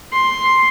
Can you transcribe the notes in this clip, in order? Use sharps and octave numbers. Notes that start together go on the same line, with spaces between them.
C6